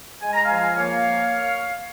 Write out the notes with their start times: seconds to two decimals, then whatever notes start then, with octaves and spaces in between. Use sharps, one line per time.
0.22 G#3 G#5
0.33 A#5
0.45 F5 G#5
0.50 F3
0.76 A#3 C#5 F5